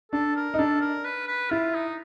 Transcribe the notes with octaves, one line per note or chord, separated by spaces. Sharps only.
D4 A4
A#4
D#4
D4 A4
A#4
B4
B4
E4 F4
D#4